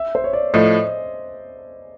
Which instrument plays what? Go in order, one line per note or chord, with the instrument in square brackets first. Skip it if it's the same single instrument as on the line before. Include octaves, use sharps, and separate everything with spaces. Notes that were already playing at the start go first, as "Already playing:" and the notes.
Already playing: [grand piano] E5
C5
C#5
D5
[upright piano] A2 F3 A3 [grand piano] D#5